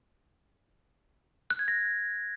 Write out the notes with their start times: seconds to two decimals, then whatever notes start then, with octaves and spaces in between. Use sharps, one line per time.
1.50 F#6
1.59 G#6
1.68 A#6